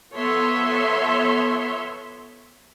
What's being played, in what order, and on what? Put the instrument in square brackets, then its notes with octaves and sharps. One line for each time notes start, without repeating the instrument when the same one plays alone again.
[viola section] F3 B3 A4 C#5 E5 C6